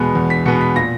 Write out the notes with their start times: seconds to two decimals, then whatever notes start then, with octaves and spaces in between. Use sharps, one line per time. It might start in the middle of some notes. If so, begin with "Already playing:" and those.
Already playing: E2 B2 G#3 B3
0.15 E2
0.30 B6
0.46 B2 G#3 B3 C#7
0.61 B6
0.76 A#2 A#6